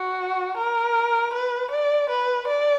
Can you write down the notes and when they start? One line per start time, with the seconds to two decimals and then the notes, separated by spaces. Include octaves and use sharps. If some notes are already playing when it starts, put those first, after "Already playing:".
Already playing: F#4
0.57 A#4
1.33 B4
1.71 D5
2.10 B4
2.48 D5